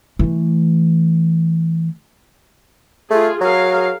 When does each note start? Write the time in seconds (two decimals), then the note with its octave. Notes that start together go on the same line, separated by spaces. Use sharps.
0.19 E3 A3
3.11 A3 F4 G#4
3.41 F#3 G#4 A#4 F5